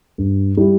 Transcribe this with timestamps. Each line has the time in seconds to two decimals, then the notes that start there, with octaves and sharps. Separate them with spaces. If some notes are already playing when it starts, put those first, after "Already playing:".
0.18 G2
0.57 G3 E4 G4